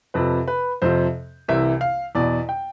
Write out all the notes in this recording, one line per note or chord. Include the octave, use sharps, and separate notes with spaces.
F2 C3 F3 B4
B4
F2 C3 F3 C5
C2 C3 E3 E5
F5
E2 B2 D5
G5